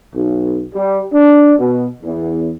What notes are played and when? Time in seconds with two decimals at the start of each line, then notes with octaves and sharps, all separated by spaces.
0.14 B1
0.74 G3
1.12 D4
1.58 B2
2.03 E2